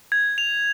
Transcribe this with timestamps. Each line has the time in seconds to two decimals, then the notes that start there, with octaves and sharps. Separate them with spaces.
0.12 G#6
0.38 F7